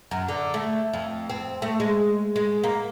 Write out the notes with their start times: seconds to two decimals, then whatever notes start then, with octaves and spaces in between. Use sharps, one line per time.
0.11 F#2
0.28 D3
0.54 A3
0.93 F2
1.30 C4
1.62 A3
1.80 G#3
2.36 G#3
2.64 A#3